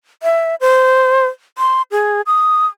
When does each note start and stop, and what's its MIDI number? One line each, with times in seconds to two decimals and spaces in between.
0.23 0.55 76
0.61 1.26 72
1.58 1.82 84
1.91 2.21 68
2.27 2.66 87